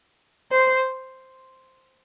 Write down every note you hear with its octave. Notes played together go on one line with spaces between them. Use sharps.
C5